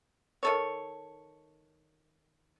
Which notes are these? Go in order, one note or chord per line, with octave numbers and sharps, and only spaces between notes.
D#3 A4 C#5